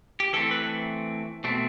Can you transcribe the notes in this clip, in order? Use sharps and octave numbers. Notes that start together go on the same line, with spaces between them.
G4
E3 A3 C4 A4
B4
B2 A3 C4